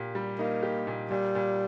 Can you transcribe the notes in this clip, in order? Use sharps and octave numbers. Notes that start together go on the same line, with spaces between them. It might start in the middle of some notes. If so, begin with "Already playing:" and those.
Already playing: A#2 G4
G3
A#3 D#4
G4
A#2
A#2 G3
A#2